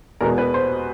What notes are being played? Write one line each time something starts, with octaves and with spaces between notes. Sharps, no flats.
E2 B2 G#3 B3 A#4
B4
C5